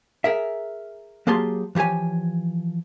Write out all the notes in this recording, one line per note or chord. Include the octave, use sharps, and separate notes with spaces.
G#4 A#4 E5
F#3 A#3 G4 G#4 A5 C6
E3 F3 G4 C#5 G#5